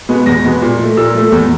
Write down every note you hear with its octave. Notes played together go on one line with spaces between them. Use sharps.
B2 G#3 B3
E2 A#6
B2 G#3 B3
A#2
F3 A3
A#2 E6
F3 A3
E2